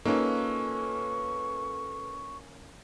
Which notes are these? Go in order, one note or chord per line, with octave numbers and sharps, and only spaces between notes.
A#3 C#4 D#4 F4 A4 B4 C#6